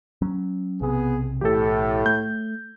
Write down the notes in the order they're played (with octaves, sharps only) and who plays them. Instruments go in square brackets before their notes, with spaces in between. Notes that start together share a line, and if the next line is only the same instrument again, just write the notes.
[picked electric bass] F#3 C#4
[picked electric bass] B1 C3 [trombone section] B3 G#4
[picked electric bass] B1 E3 [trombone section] A2 [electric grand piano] G4 A4
[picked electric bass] A3 [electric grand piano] G6